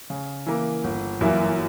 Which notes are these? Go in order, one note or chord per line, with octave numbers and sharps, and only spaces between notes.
C#3
E3 A#3
G1
F#2 E3 A#3 E4